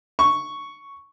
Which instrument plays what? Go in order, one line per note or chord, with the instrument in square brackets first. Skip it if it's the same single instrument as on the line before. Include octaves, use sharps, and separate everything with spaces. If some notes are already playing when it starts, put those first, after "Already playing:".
[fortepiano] C#6